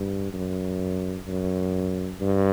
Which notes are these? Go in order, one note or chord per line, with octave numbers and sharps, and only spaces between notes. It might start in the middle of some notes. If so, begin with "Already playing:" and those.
Already playing: G2
F#2
F#2
G2